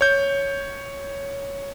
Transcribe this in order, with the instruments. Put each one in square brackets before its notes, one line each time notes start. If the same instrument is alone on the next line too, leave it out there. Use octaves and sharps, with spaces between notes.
[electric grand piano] C#5 G6